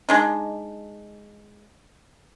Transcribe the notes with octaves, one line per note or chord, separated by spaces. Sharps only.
G#3 D4 D#4